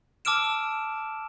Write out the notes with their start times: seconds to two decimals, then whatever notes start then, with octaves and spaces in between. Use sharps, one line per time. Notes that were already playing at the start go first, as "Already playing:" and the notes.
0.25 A5 D6 E6 F6 D7 E7